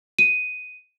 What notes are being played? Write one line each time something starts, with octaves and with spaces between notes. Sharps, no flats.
D#7